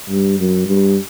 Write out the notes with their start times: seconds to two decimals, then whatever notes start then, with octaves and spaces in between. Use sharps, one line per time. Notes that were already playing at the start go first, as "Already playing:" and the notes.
0.09 G2
0.38 F#2
0.67 G2